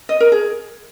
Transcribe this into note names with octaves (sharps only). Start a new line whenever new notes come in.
D#5
A#4
G#4